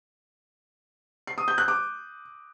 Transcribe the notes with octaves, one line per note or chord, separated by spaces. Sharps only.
C7
D#6
G6
F#6
D6